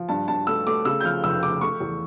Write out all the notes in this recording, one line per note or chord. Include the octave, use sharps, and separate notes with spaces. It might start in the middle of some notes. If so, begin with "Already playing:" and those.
Already playing: F3
G2 A5
G2 A5
A3 E6
A3 D6
C#3 E6
G6
F3 F6
F1 E6
C#3 D6
A3 C#6
E2